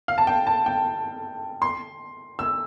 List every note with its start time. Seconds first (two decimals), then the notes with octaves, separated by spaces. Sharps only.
0.08 F5
0.18 A5
0.27 G5
0.47 A5
0.66 G5
1.62 C6
2.39 E6